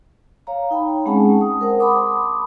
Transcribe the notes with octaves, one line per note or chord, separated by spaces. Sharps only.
C#5 F5 A#5
D#4 G5 B5
G#3 C4 C#4 G#4 F#5 A5
D#6
A#4 C5 F#5
A5 B5 C6 D6 D#6